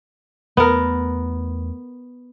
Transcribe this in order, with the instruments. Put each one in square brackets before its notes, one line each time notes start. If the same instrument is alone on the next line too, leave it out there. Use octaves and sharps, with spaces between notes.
[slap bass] E2 A3 [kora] B3 A#4